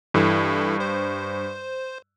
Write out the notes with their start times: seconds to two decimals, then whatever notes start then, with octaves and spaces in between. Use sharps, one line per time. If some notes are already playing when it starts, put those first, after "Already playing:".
0.14 G2 E3 E4 A4
0.80 C5